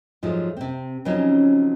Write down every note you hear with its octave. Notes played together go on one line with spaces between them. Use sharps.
G#2 F3 F#3 A3 G#4
C3 C4
C#3 F3 F#3 C4 C#4 D#4